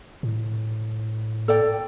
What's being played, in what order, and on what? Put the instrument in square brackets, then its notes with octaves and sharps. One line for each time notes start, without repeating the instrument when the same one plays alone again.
[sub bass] A2
[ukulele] A4 D5 G5